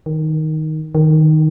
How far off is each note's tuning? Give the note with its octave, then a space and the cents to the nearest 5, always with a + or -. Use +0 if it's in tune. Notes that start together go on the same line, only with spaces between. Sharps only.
D#3 +5
D#3 +0